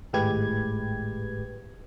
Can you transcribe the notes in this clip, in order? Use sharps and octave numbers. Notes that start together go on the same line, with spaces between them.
G#1 A2 G#3 G4 B4 G#6